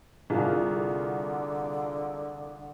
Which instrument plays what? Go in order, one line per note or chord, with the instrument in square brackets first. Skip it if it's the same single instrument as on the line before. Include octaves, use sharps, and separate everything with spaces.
[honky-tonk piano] C2 [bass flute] D3 [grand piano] F4 G#4 A#4